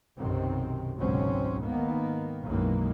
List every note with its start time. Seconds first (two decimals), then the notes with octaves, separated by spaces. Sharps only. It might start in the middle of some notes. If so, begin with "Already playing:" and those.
0.17 B1 F#2 C3 D#3 C4
0.96 G#1 C#2 B2 F#3 C4 C#4
1.63 G#2 D#3 A#3 B3
2.44 B1 F#2 D#3 E3 G#3 A#3